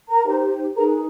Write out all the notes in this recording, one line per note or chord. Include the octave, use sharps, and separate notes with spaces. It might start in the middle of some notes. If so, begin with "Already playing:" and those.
A#4 A#5
D#4 G4 C5
D#4 G#4 A#4 B4 A#5